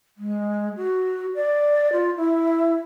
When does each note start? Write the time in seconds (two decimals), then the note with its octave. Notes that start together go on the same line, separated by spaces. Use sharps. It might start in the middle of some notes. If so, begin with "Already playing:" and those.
0.17 G#3
0.76 F#4
1.35 D5
1.92 F4
2.16 E4